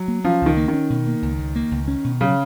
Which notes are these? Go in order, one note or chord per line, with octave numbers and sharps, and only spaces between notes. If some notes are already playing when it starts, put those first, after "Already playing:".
Already playing: F#3
A#3
F3 C#4
C#2 D#3
A#3
D#3
C#4
B2
A#3
C#2
C#2
A#3
C#2
C#4
B2
C#3 F#3